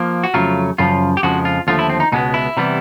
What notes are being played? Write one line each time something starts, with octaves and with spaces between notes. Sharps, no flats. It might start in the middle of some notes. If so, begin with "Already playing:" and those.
Already playing: F3 A#3
F#4
F2 C#3 F#3 A3 F4
F#2 C#3 F3 F4
G4
F2 C#3 F3 G#3 F#4
F4
D#2 D3 F3 A3 F4
E4
C4
D#4
C#2 B2 G#3 B3 D#4
E4
C3 E3 G3 B3